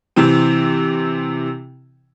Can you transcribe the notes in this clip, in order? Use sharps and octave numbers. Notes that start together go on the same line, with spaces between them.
C3 E3 C4